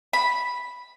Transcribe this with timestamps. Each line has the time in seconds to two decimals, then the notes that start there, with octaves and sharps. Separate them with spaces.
0.13 B5